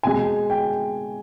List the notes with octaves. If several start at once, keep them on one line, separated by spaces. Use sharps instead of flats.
B2 G#3 G#5
G5